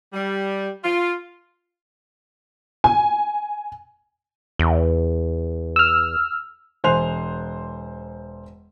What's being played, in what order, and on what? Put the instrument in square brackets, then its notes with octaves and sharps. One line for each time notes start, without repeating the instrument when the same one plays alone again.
[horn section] G3
F4
[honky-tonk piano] G#5
[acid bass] E2
[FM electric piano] E6 F6
[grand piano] E1 C5 G#5 C6 F#6 F7